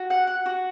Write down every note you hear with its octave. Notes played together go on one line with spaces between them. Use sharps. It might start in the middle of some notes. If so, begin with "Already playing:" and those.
Already playing: F#4
F#5
F#5
F#4